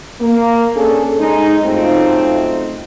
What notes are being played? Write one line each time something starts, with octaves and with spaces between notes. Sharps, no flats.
A#3
C#4 D4 G#4 A4
G#3 D#4
F#2 A3 C4 D#4 F4